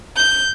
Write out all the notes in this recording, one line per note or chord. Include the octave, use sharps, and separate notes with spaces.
G6